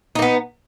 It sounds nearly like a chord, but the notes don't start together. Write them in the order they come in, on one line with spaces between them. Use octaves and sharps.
D#4 A#3 B3